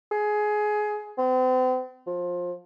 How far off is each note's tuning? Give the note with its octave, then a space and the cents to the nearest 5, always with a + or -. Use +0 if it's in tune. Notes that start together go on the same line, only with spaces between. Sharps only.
G#4 +20
C4 -40
F3 +20